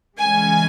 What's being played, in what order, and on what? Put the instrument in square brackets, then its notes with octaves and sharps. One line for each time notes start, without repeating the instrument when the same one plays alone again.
[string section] C#3 E3 G#3 C#4 G#5